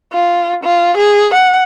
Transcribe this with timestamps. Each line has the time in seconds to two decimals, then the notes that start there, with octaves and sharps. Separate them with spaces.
0.12 F4
0.63 F4
0.97 G#4
1.34 F#5